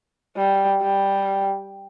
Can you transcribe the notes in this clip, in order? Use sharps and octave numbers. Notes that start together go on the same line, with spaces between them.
G3
G3